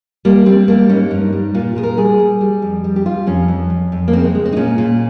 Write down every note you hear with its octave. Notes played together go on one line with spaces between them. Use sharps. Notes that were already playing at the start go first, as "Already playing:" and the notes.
G3 A#3
G3 C4
G3 A#3
G#2 C#4
G2 D#4
G3
A#2 F4
A#2 G#4
A#4
G3 G#4
G3
G3
F2
G3
G4
G3 F4
F2 C#4
F2
F2
F2
A#3
C#3 C4
G#3
G#3
C4
D#4
A#2 C#4
A#2